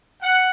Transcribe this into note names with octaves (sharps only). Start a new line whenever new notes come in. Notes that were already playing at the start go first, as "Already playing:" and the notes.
F#5